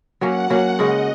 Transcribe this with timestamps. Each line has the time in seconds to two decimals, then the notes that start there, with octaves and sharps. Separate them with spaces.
0.21 F#3 A#3 C#4 F#5
0.50 F#3 A#3 C#4
0.79 C#3 G#3 F#4 D#5